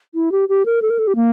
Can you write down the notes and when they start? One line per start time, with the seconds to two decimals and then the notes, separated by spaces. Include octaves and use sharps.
0.15 E4
0.32 G4
0.49 G4
0.66 A#4
0.82 A4
0.90 A#4
0.99 A4
1.07 G4
1.16 A#3